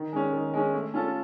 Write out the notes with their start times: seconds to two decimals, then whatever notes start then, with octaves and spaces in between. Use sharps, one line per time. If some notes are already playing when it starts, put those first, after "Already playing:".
Already playing: D#3
0.13 G#3 C#4
0.33 D#3
0.54 G#3 C#4
0.74 A3
0.94 C#4 F4 A4